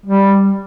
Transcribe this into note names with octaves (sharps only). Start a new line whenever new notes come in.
G3